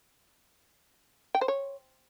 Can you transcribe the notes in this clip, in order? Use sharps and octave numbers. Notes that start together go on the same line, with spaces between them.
G5
C5
C#5